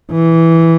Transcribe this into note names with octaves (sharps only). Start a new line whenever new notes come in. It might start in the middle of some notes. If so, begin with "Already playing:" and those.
E3